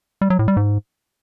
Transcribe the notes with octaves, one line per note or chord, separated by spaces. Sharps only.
G3
F#3
A2
G3
G#2